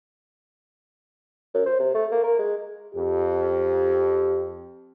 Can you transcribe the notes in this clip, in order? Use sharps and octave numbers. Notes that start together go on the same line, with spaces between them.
F#2
C5
C3
A3
A#3
A#4
G#3
F2 G4